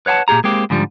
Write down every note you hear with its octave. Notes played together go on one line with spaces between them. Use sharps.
B4 C#5 F#5 G#5 A5
A#2 G4 G#4 A#5
G#3 A#3 C4 G4
G#2 D3 F3 G3